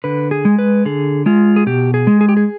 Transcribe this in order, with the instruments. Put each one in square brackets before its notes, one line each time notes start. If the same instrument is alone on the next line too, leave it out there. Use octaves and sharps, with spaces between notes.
[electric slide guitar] D3 B4
G#4
G#3
B4
D3 G#4
G#3 F4
G#4
B2 G4
G#4
G#3
G#4
G4
G#4